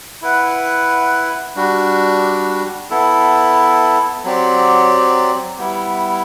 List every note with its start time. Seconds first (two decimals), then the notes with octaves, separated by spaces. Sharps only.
0.22 E4 B4 F#5
1.56 G3 D4 F#4
2.90 B3 E4 A4
4.24 F#3 C4 G4 D5
5.58 G3 B3 E4